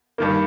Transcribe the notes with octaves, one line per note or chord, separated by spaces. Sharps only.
G2 D#3 A#3